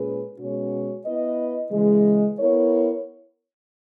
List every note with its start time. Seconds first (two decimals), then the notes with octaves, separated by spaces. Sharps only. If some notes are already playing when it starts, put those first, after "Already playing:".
Already playing: A#2 G#3 C#4 G#4 B4
0.39 B2 G#3 C#4 F#4 C#5
1.05 B3 E4 B4 D#5
1.72 C#3 E3 G#3
2.39 B3 E4 A#4 C#5